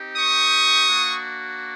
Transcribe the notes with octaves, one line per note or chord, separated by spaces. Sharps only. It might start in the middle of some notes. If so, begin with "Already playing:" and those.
Already playing: C4 D#4 G4
C#6 D#6
A#3 D4 F#4